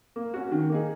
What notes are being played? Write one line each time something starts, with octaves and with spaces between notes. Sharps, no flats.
A#3
C#4 F#4
D#3
A#3 D#4 G#4